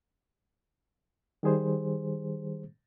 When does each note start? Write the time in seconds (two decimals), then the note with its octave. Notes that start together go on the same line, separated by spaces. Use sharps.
1.43 D#3 G3 G#4 C5